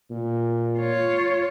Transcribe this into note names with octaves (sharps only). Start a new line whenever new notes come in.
A#2
F4 C#5